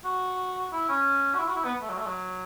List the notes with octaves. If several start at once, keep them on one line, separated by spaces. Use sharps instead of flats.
F#4
E4
C#4
F#4
E4
F#4
E4
B3
A3
F#3
A3
F#3